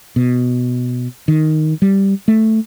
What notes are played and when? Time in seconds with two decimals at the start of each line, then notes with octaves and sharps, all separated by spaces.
0.16 B2
1.28 D#3
1.82 G3
2.28 A3